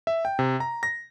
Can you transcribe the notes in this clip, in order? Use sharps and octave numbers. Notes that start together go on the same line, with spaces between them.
E5
G5
C3
A#5
A#6